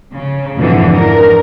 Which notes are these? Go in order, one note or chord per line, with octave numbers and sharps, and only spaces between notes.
C#3
F2 G#2 B2 D3 E3 F3
A#4